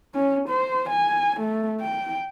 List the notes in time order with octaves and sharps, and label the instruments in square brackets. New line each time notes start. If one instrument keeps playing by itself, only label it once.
[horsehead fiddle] C#4
C5
G#5
A3
G5